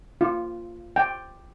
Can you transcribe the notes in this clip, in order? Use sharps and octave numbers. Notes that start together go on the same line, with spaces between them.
F4
G5